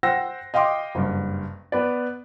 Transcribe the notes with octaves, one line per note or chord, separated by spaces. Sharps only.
C5 F#5 G5 E6 A#6
D#5 F5 G5 C6 D6
F#1 G2
B3 B4 D5